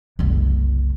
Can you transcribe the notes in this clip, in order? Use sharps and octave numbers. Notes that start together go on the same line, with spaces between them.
F#1 C2